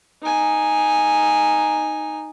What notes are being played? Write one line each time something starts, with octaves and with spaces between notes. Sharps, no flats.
D#4 G#5